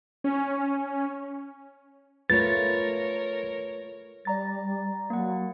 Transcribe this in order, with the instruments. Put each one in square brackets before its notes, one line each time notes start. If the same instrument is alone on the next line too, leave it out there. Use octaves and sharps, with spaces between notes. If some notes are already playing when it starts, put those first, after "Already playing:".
[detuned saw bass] C#4
[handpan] A3 F4 B4 [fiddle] A#4 C#5 [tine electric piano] A6
[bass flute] G3 [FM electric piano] D5 A#5 A6
[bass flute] F#3 [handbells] A#3 F#5